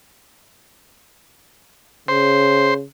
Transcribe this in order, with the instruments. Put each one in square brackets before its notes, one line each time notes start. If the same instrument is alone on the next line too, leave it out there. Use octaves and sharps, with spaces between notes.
[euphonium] C#3 [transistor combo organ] C5